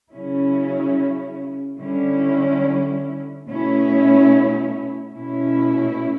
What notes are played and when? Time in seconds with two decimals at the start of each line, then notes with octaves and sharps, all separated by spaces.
0.11 C#3 F#3 C#4 E4
1.79 D3 G3 C#4 E4
3.47 B2 A3 C#4 E4
5.15 B2 A3 C#4 E4